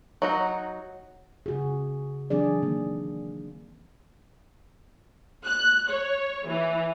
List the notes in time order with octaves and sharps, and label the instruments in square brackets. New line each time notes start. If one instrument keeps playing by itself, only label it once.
[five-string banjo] F#3 D#4 F#4
[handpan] C#3 F#4 G#4
E3 F#3 C4 D4 G#4 D5
D#3 A#3
[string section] F#6
C#5
E3